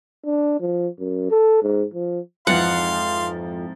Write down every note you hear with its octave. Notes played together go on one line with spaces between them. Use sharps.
D4
F3
F#2
A4
G#2
F3
F2 G#2 E3 F3 F5 F#5 C6